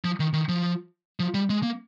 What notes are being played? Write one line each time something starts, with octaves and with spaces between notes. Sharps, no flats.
F3
D#3
D#3
F3
F3
G3
G#3
A#3